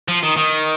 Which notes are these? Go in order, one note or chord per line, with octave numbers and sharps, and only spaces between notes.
F3
D#3
D#3